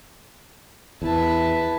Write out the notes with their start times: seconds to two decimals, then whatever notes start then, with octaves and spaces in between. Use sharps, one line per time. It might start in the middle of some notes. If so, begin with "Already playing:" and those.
1.02 E2 E4 B4 E5 A5